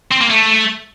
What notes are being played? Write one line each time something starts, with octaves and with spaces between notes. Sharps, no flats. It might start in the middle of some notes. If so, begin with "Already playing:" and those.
C4
A#3
A3